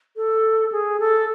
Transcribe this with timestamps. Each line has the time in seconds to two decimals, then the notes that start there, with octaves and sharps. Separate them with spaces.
0.17 A4
0.72 G#4
1.00 A4